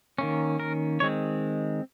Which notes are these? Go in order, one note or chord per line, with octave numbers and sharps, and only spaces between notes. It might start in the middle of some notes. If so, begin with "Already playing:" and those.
D#3 A#3 C#4
A#4
D#3 G#3 C4 C#5